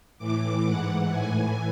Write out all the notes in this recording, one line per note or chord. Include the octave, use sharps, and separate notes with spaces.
A2 E3 D6
G#2 E3 F#5
A2 E3 G#5